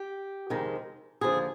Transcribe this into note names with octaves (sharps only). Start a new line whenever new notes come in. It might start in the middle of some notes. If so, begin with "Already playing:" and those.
Already playing: G4
F2 C3 D#3 G#3
D#2 D3 F3 G#4